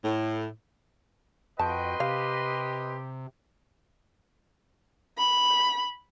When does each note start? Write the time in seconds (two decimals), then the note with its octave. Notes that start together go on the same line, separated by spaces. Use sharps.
0.04 A2
1.59 F2 F#4 B4 D#5 G5 A5 C6
2.00 C3 G4 F5
5.18 B5